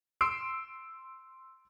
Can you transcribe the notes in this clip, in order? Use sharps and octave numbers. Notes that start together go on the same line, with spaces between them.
C6 E6 C7 D7